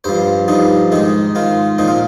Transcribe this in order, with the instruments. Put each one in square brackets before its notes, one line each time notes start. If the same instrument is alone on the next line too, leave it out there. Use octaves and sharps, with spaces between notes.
[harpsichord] G2 F3 C5
G2 F3 D#4
G#2 D#3 D#4
G#2 D#3 F4
A#2 F3 D#4
F4